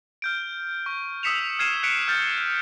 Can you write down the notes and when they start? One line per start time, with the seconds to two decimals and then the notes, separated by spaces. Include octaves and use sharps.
0.22 F6 G6 D7
0.86 C#6
1.23 D#6 E6 B6 C#7 E7 F7
1.59 F6 G#6 C7 D#7 E7
1.83 F#6 B6 C#7 D7 F7
2.08 F6 G6 A6